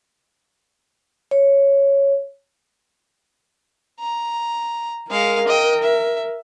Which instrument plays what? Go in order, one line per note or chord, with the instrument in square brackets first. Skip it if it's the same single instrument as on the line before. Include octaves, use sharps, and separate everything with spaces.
[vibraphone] C#5
[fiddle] A#5
[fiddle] G#3 F5 [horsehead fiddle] A#4
[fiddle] D#5 G5
E5